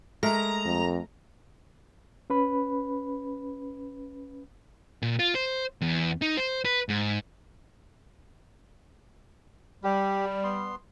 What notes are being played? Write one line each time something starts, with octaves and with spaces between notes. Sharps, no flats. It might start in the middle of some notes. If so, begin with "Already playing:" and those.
G#3 A3 A#4 A#5
F2
C#4 B4 B5
A#2
F4
C5
E2
D#4
C5
B4
G#2
G3 G4
B3 C6